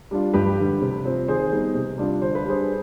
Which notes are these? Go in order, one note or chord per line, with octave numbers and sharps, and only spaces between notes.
G3 D4 F4
G2 G4 B4
D3 G3
C3
F3 C4
D#3 G#4 C5
G3 B3 D#4
C3
G3 D4 F4
D3 C5
B4
G3 D4 G#4 C5